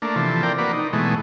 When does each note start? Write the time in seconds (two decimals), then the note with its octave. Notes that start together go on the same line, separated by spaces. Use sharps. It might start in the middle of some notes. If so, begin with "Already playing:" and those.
0.02 A3 A#3 D4
0.16 C3 E3 F3 A4
0.43 C4 A#4 D5 G5
0.58 A#3 F#4 B4 D5
0.73 D#4
0.93 B2 E3 G#3 A3